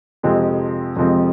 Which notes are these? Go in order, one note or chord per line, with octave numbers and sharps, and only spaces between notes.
F2 C3 F3 G#3 C4
F2 C3 F3 G#3 C4